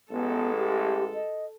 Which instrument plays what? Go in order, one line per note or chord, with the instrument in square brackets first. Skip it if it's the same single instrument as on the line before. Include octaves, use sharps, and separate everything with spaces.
[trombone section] A1 G#3 [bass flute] B3 [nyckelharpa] A4
[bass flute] G4
D#5